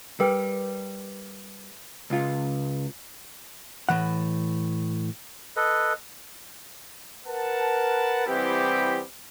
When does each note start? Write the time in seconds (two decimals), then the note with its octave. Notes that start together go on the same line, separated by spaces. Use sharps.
0.20 G3 A#4 B4 G5
2.10 C#2 F4
3.89 A2 E3 F#5
5.56 A4 B4 D#5
7.27 A#4 B4 F#5 A5
8.27 E3 G3 B3 C4 E4 G4